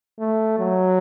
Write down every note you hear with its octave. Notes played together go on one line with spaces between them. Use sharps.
A3
F#3